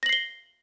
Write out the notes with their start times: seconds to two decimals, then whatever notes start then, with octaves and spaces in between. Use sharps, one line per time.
0.03 A#6
0.06 F#7
0.09 C7
0.13 G7